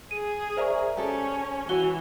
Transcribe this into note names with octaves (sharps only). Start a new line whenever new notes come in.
G#4 D#7
A#4 C5 D5 E5 A#5 C#6
C#4 G4 A4
E3 F#4 G#5 G7